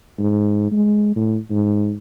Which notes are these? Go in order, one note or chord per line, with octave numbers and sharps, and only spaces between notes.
G#2
G#3
A2
G#2